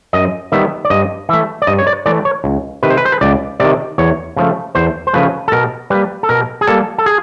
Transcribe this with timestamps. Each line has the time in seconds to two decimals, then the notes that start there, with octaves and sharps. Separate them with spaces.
0.13 F#2 D#5
0.52 D#3 G3 B3 E5
0.85 D5
0.90 G2 D#5
1.29 E3 A3 E5
1.62 D5
1.67 G2 D#5
1.79 C#5
1.87 D5
2.06 E3 A3 D5
2.25 C#5
2.44 C#2
2.83 C3 D#3 B4
2.90 C5
2.97 B4
3.05 C5
3.12 B4
3.21 C#2 D5
3.60 C3 D#3 D5
3.98 E2 C#5
4.36 C#3 F3 A3
4.75 E2 C5
5.07 C5
5.13 C#3 F3 A3 B4
5.48 A4
5.52 B2 A#4
5.90 G3 A#3 B4
6.23 A4
6.29 B2 A#4
6.61 G#4
6.67 G3 A#3 A4
6.98 A4
7.06 G#4